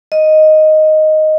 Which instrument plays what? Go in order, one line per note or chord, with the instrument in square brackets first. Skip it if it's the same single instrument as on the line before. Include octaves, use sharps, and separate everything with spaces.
[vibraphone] D#5